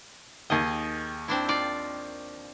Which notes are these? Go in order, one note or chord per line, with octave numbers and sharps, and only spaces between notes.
D#2 D#3 G#4 D#5
C4 D4 E4
F4 D5